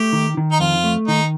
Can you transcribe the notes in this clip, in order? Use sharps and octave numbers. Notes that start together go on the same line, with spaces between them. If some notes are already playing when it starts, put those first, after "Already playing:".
Already playing: A3 G4
D#3
D#3
D#4
F2 F4
A3
D#3 D#4